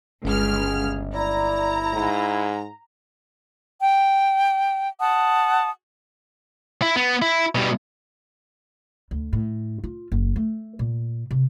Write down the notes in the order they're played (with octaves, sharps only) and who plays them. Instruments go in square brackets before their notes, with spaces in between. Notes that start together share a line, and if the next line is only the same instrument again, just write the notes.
[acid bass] G1 [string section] C#2 F6 [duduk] G#4
[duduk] E4 [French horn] D5 [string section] A#5
[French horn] G#2
[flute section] G5
F#5 A5 D#6
[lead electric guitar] E4
B3
E4
B2 G3
[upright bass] D2
A2
F4
F#1
A3
A#2
C3